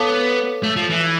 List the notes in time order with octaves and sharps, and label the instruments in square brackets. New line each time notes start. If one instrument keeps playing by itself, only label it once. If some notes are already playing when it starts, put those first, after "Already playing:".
Already playing: [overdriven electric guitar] B3 [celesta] A4 C#5 F5 A5 D6
[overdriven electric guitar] A3
F3
E3